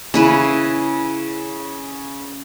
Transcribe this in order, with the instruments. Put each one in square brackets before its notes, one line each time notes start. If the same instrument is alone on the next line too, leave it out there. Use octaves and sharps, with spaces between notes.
[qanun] C#3 E4 B4